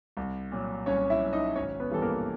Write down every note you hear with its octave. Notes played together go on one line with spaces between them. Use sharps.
C2
A#2 F#3
C2 C#4 C#5
E4 E5
A#2 F#3
D#4 D#5
G#1 C#4 C#5
B3 B4
G2 E3 G3 A4
A#3 A#4